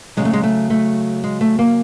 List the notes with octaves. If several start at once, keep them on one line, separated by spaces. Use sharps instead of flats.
C#3 F#3 G#3
A3
G#3
A3
A3
G#3
A3
A#3